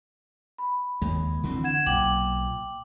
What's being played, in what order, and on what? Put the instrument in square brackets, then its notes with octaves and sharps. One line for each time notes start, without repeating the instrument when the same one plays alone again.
[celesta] B5
[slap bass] D#2 G#3
D3 E3 C4
[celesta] F#5 G#6 E7
[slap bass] B1 A#2 [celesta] G5 D6 F#7